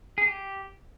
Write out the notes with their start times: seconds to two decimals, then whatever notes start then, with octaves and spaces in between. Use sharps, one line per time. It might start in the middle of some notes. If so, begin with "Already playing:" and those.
0.18 G#4
0.26 G4